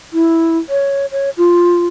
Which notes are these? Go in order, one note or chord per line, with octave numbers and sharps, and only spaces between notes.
E4
C#5
C#5
F4